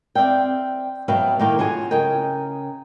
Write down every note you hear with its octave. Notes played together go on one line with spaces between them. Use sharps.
C4 D5 E5 F5 G5
B2 F#3 B4 E5 F5 G5
A2 D#3 A#3 F5 G5
F#3 F4 F#4 G#4 G#5
C#3 A#4 D#5 G5